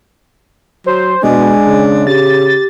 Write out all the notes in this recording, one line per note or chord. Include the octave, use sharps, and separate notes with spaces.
F#3 C5
B2 G#3 D4 G#5
C#3
G4 A6